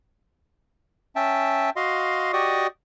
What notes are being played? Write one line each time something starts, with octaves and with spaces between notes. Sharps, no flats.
C#4 E5 G5 A5
F#4 D#5 F5 C6
F#4 G4 D5 D#5 C#6 D#6